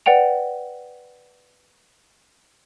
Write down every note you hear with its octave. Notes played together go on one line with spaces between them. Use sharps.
B4 D5 F#5 G5 F7